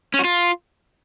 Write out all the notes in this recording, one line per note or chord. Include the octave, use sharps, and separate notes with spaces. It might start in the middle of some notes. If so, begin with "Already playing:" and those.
C#4
F#4
F4